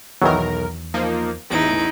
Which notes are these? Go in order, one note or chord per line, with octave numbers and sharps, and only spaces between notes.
B1 E2 D#3 E3 F#3 A#4
F3 A#3 D#4
A1 E2 D#4 E4 D7